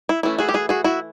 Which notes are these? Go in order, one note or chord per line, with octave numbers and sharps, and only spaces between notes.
E4
E3 A3 C#4 E4
F#4 G#4
G4
F#4 G#4
F#4 G#4
E4 F#4